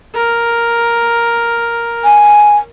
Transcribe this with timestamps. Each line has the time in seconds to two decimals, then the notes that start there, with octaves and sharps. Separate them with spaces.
0.14 A#4
2.04 G#5